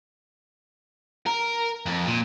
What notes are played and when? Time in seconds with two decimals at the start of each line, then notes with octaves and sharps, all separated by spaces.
1.27 A#4
1.86 F2
2.07 A#2